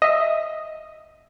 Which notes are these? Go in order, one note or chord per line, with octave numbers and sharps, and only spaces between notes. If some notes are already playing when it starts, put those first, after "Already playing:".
D#5 E5